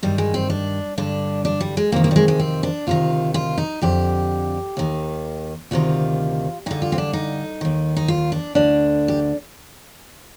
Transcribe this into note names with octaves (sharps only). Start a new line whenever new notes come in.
G2 D#3 G3
G#3
C4
D4
G2 D3 D4
D4
G3
G#3
F2 C3 D#3 A#3
A#3
G3
G#3
G#3
C4
D4
D2 C3 D#3 F4
F4
D#4
F2 D3 G4
D#2 D#3
D2 C3 D#3 F4
G2 D3 D#4
F4
C4
D4
D#4
D#2 D#3
D#4
F4
D4
D2 D3 D4
G4